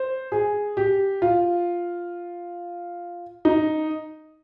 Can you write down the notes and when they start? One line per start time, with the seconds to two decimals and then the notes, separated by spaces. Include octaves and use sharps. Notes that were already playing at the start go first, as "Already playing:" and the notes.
Already playing: C5
0.32 G#4
0.77 G4
1.22 F4
3.45 D#4